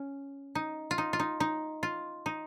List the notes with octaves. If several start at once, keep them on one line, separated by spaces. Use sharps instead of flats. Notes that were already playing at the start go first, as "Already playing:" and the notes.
Already playing: C#4
D#4
F4
D#4
F4
D#4
D#4
F4
D#4